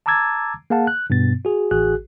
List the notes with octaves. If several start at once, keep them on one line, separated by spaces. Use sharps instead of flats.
A5 A#5 D6 E6 G#6 A6
A#3 G#4 F5 F#5 A5
F#6
G2 B2 B3 A6
F#4 G#4
A1 F#4 G#4 F#6